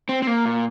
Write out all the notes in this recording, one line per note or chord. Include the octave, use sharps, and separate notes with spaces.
C4
C4
A#3
A#2